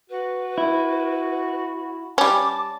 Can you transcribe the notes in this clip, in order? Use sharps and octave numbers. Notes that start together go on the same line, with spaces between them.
F#4 B4
E4
G3 C#4 A5 D6